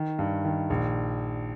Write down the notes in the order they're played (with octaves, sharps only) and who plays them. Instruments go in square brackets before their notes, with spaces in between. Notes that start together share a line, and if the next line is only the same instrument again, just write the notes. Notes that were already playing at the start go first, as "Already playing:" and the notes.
Already playing: [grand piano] D#3
G2
D#3
A#1